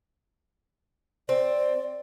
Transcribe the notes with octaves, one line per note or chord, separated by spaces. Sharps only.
C4 D5